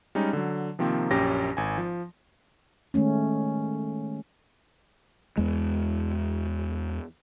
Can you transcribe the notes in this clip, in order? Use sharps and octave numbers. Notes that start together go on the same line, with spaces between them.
G3 G#3 C#4 D#4
D3 F#3
C3 D#3 F3 A#3 C4
A#1 F#2 C#4 G4 A#6
G#1 G#5
F3
D#3 G#3 A3 C#4
E2 G#3